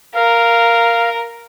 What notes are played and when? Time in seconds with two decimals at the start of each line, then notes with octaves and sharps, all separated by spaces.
0.15 A#4 F5